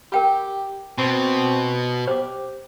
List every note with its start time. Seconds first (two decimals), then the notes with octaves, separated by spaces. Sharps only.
0.12 G4 A#4 G5 B5
0.98 B2 C4
2.07 G4 C5 D6